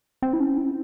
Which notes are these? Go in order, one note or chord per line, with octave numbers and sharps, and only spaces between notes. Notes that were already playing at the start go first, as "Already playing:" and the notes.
C4
E4
C#4
E4